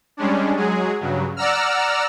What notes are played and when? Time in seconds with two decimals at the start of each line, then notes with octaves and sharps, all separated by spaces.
0.17 G3 G#3 C#4 D4
0.56 F#3 G#3 G#4
1.01 G2 C#3 F#3
1.36 D5 F#5 A#5 E6 F6